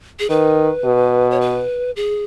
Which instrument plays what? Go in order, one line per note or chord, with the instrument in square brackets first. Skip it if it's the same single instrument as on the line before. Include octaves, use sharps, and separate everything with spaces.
[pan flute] G#4
[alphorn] D#3 [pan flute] B4
[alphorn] B2
[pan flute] C#5
B4
G#4